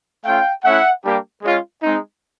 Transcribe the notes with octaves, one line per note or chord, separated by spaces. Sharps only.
A3 C#4 F4 F5 G5
A3 C#4 E4 E5 F#5
G3 A#3 D4 G4
G#3 C#4 F4
G#3 C4 D#4